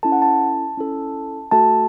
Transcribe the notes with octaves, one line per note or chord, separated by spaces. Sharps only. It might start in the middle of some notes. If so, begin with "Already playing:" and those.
C#4 E4 A4 A5
F#5
A5
C#4 E4 A4
A3 F#4 A4 A5